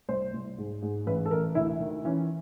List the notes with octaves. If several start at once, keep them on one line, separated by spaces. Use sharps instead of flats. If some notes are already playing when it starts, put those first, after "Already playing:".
C2 C5
C2
G#2
G#2
A1 B4
A4
A1 A#4
D2 E4
D#3
E3 C#4